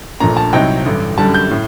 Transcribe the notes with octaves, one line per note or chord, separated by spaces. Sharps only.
A#1 A#2 A3 D4 A#5
A5
C2 C3 F#3 C4 D#4 G5
A1 G2 D3
F#2 D3 G3 A5
G6
A2